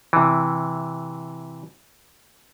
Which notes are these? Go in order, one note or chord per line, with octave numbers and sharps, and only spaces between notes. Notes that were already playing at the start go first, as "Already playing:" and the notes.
C3 E3